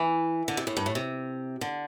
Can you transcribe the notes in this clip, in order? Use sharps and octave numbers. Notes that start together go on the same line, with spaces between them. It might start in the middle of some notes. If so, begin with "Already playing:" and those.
Already playing: E3
D3
C3
A2
G2
A2
C3
D3